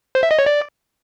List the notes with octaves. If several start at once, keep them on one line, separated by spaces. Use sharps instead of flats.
C5
E5
D#5
C#5
D5